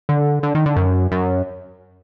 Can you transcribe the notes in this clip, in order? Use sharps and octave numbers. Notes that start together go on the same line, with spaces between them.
D3
D3
D#3
D3
F#2
F#2